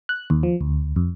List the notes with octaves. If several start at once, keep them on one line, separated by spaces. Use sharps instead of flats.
F#6
D#2
F3
D2
F2